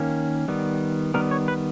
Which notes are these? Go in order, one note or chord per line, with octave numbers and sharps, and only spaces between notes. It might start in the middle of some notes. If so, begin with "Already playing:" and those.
Already playing: D#3 A#3 C#4
D#3 G3 B3
D#3 G3 B3 A#4
C#5
B4